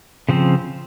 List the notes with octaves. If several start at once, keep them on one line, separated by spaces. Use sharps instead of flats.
C#3 F3 C4